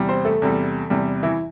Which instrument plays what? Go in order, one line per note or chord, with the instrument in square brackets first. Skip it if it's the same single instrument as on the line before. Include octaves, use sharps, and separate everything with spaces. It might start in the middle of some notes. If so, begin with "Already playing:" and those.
Already playing: [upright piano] E2 C3 G3
C4 C5
A3 A4
E2 C3 G3
E2 C3 G3
E3 E4